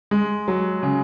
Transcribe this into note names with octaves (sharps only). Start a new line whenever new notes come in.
G#3
F#3
C#3